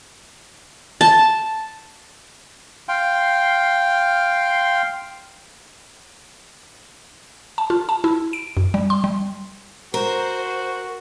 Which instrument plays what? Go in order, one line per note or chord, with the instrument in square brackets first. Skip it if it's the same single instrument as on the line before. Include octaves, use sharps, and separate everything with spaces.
[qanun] A5
[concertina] F5 G5 C6
[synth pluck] A5
F4
A5
E4
D7
F#2
G3
C6
G3
[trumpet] F#4 [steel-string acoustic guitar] A#4 [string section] C5